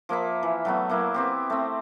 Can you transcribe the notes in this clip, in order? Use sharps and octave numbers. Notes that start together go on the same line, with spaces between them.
F3 A#3 E5 B5
E3
F#3 A3 B3
F#3 A#3 E4
B3 C4 G4
A3 C4